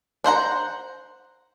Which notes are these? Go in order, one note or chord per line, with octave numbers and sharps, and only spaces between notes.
D4 C5 F#5 A#5